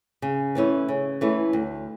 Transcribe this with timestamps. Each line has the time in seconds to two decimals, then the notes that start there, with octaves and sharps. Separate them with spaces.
0.22 C#3
0.55 E3 A3 C#4 E4
0.88 C#3
1.21 E3 A3 C#4 E4
1.53 D2